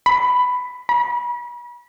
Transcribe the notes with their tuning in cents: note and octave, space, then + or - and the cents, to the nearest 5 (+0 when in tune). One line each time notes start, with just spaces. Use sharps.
B5 +10
B5 -40